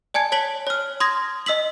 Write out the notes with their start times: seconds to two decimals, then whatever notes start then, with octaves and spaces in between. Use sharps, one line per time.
0.14 D5 G#5 A5 G#6 C#7
0.32 C#5 A5 B6 F#7
0.67 C#5 F6
1.00 C6 D#6 G#6 A#6
1.46 D#5 E6 B6 F#7